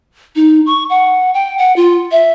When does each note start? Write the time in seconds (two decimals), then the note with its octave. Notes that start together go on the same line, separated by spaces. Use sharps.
0.36 D#4
0.66 C#6
0.90 F#5
1.34 G5
1.58 F#5
1.76 F4
2.12 E5